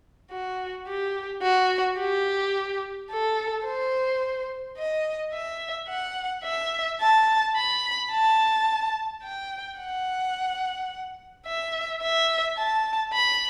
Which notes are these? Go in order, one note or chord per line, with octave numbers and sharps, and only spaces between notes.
F#4
G4
F#4
G4
A4
C5
D#5
E5
F#5
E5
A5
B5
A5
G5
F#5
E5
E5
A5
B5